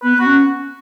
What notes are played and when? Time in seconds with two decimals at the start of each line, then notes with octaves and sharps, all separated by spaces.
0.03 B3 B4
0.17 B3 F#4
0.26 C#4